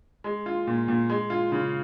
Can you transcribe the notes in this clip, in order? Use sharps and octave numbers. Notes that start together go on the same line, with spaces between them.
G#3
F4
A#2
A#2
G#3
F4
C#3